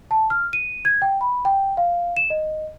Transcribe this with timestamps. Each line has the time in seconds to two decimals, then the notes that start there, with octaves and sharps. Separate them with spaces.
0.11 A5
0.30 F6
0.53 D#7
0.85 G#6
1.02 G5
1.21 B5
1.45 G5
1.77 F5
2.17 E7
2.30 D#5